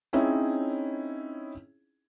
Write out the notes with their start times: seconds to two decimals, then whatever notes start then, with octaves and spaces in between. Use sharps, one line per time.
0.13 C4 C#4 D#4 E4 G#4 C#5